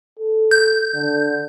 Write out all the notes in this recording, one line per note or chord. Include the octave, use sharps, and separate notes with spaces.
A4
G6
D3